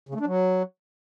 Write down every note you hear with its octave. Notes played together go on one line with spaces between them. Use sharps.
C#3
A3
D4
F#3